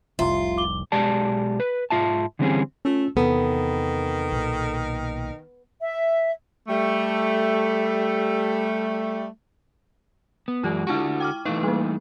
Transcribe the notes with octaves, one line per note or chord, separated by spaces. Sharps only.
F1 C2 F4 E5 A#5 C6
D6 G7
B1 G#3 G4 D5 A5
B4
G#2 E3 F4 E5 A5
D3 E3 G3 C4 C#4 G#4
A3 C#4 F4
E2 C3 D#3 B3 A4
B1 A#2
E5
G3 A3
B3
F#2 E3 G#3 F4 G4 D5
D3 D4 E4 F#4 A5 C#6
G5 D6 F6
E3 A3 D#4 B4 F5 C#6
G3 A#3